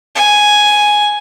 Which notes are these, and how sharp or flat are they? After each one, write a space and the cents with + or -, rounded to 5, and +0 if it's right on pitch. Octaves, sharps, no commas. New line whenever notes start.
G#5 +5